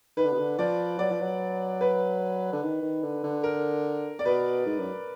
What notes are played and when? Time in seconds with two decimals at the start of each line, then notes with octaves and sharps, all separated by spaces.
0.17 D#3 B4
0.24 D3
0.32 B2
0.39 D3
0.58 F3 D5
0.98 F#3 D5
1.10 F3
1.21 F#3
1.81 B4
2.53 D3
2.63 D#3
2.82 D#3
3.03 D3
3.24 D3
3.43 A#4
4.19 D5
4.25 B2 B4
4.66 G#2
4.79 F#2